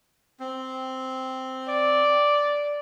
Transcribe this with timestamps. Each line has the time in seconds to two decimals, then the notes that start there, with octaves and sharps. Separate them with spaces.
0.40 C4
1.69 D5